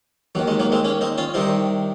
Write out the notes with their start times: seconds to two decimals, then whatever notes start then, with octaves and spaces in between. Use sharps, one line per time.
0.35 D#2 D#3 F#3
0.48 G#3
0.59 F#3 A#3
0.72 G#3 C4
0.85 A#3 C#4
1.01 C4 D#4
1.18 C#4 F4
1.34 C2 C3 D#3 C4 D#4